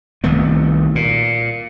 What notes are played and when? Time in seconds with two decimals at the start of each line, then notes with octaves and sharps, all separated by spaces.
0.24 C2 D#3 A3 B3
0.95 A#2